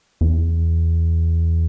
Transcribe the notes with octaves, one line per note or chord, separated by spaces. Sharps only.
E2